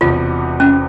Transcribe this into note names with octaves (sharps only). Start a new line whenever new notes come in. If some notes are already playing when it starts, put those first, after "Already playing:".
E1 E2 C3 F4
C#4